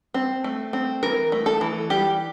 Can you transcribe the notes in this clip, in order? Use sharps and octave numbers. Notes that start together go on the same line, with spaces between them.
C4
A3
C4
E3 A#4
A3
A4
E3
G3 G4